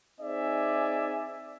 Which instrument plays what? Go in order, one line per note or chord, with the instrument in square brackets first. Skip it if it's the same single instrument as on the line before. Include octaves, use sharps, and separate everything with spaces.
[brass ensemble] C4 D#4 G#4 D5 E5 G#5